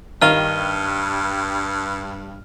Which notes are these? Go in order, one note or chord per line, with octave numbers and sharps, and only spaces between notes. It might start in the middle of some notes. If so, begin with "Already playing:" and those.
G2 D#3 F5 F6 D#7 G7